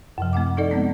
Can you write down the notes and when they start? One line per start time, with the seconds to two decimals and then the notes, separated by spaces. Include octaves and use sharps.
0.18 F#2 C3 F3
0.33 A3 C4 F#5 D6
0.57 D#4 A4 D5 D#5
0.71 G#3 B3 C4